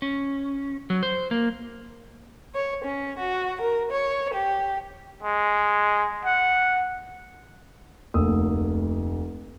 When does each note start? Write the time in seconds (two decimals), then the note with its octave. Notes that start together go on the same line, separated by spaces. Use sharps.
0.02 C#4
0.90 F#3
1.03 C5
1.31 A#3
2.54 C#5
2.84 C#4
3.18 F#4
3.60 A#4
3.91 C#5
4.33 G4
5.23 G#3
6.25 F#5
8.14 F1 D2 A#3 D#6 E6